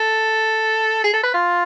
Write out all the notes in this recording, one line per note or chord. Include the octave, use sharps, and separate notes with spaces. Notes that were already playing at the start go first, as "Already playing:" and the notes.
Already playing: A4
G#4
A4
B4
F4